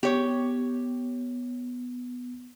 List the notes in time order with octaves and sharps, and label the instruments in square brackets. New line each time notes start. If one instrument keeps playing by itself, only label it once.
[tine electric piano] B3 [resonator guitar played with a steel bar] G4 C#5